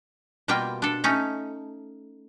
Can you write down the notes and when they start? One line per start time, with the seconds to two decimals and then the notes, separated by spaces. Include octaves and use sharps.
0.48 B2 G3 A#3 F4 G5
0.82 D4 A4
1.04 A3 C#4 D#4